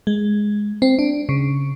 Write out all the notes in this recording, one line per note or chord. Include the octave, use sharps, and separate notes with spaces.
G#3
C4
D4
C#3